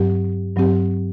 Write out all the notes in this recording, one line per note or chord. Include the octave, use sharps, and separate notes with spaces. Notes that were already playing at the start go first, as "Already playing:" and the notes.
Already playing: G2 F#3 C4 G4
G2 F#3 C4 G4